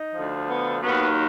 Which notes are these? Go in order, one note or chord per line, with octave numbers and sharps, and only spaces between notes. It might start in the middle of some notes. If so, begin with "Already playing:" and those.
Already playing: D#4
D2 D3 F3
B3
D#2 D#3 F#3 B3